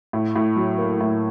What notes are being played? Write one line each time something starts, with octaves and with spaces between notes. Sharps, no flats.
A2
A2
F#3
A#3
A2